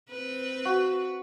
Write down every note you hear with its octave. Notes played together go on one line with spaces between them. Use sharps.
C4 B4
F#4